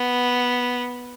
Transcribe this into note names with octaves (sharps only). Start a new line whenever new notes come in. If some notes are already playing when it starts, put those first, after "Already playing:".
Already playing: B3